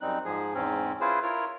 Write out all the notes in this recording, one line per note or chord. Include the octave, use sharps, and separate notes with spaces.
F#2 G3 C4 D#4 F#6
G#2 F3 G#4
E2 G#2 C4 C#4
C#4 E4 F4 G#4 B4 C5
E4 F4 A#4 C#5